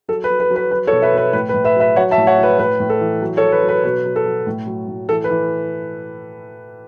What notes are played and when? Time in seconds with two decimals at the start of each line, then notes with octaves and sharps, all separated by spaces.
0.08 F#3 A4
0.24 B4
0.30 F#3
0.40 B4
0.50 F#3
0.56 B4
0.71 F#3 B4
0.87 A4 C#5
0.93 B2
1.02 B4 E5
1.13 B2 B4
1.33 A2 B4
1.49 B4
1.54 A2
1.64 B4 E5
1.76 F#3 B4 E5
1.96 F#3 C#5 F#5
2.11 E5 A5
2.18 A2
2.27 C#5 F#5
2.38 F#3
2.43 B4
2.59 A2 B4
2.80 A2
2.89 A4
3.00 E3
3.21 F#3
3.37 A4 C#5
3.43 F#3
3.52 B4
3.63 F#3
3.69 B4
3.84 B2 B4
4.05 F#3
4.16 A4
4.26 F#3
4.47 A2
4.67 F#3
4.88 A2
5.09 E3 A4
5.24 B4
5.30 E3